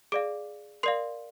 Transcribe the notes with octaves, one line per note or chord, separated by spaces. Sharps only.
G#4 D5 F5 D6 D7
A#4 D5 F5 C6 C7